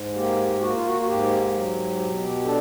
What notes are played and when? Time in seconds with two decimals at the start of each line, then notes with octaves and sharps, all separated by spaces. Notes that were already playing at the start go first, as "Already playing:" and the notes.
Already playing: G#2
0.14 A#3 G4
0.60 A#3 F#4
0.73 F4
0.85 F#4
1.01 F#4
1.06 G#2 G4
1.52 F#3
1.99 B2
2.44 D4 A4